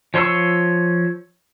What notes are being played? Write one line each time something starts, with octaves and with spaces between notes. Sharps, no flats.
F3 C#5 C6 C#6 E6